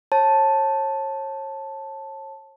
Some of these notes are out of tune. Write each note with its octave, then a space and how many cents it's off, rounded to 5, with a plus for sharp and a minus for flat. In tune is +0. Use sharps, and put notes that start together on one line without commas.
C#5 -35 A5 +0